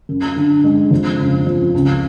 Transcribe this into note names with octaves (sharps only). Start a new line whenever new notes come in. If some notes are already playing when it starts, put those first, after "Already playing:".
F#2
D3
G#3
F2
C#3
F3
C#2